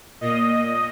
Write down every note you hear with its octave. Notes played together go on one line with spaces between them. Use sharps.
A#2 D#5